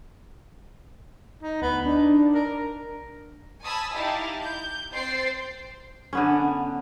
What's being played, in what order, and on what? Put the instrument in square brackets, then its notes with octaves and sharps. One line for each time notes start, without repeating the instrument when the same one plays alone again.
[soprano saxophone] D#4
[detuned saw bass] D2 [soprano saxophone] B3
[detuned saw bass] D4 [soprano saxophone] D#4
[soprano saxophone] A#4
[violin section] G#5 A5 B5 D#6 E6
D#4 E4 G4 F5 A5
G6
C4 C5 G5 A6 C7
[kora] D3 B3 C#4